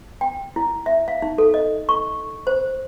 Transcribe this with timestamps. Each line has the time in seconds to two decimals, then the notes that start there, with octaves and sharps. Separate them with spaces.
0.21 G5
0.56 E4
0.86 E5
1.08 F5
1.22 D#4
1.38 A4
1.54 D#5
1.89 C#6
2.47 C5